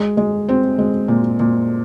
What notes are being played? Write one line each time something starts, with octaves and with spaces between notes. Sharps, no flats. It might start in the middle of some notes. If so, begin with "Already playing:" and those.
Already playing: G#3
G#3
C4
G#3
A#2
A#2